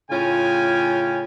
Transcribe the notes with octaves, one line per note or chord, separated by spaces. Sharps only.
A2 C#3 C#4 F4 G5 G#5